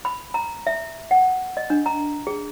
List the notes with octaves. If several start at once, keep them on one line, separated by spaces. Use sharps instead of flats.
B5
A#5
E5
F#5
D#5
D4
A#5
G#4